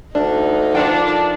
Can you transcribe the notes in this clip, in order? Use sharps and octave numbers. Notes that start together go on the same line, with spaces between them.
D2 D4 D#4
F3 D4 A4 A#4 G5